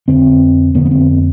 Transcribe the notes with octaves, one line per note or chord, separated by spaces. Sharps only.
F2 D3 C4
F2 D3 B3
B3
C4